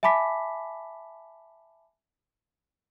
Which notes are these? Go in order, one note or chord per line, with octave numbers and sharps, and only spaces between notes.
E5 G#5 A5 B5 D6 B6